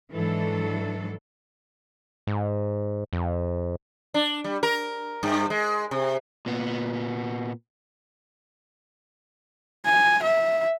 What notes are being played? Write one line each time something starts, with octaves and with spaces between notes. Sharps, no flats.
G#2 E3 F#3 D4 A4
G#2
F2
D4
G3
A#4
G2
G#3
C3
A#2 B3
G#5
E5